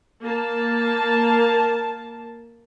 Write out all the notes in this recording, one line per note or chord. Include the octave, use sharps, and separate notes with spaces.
A#3 A5